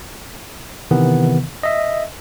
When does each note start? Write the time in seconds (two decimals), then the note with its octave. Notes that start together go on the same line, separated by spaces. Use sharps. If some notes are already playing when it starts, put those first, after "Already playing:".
0.91 C3 D#3 E3 B3
1.63 D#5 E5